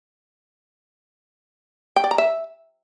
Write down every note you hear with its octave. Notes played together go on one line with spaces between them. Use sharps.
G5
D5
A#5
E5